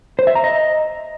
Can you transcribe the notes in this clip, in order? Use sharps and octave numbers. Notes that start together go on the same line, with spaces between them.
C5
E5
A#5
D#5